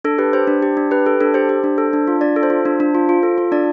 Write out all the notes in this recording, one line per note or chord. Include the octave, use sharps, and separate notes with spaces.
D4 A4
G4 B4
G4 C5
D4
G4
D4
G4 B4
G4 A4
D4 A4
G4 C5
G4
D4
A4
D4
F4
D4 D5
A4
C5
F4
D4
D4
F4
F4
A4
F4
D4 D5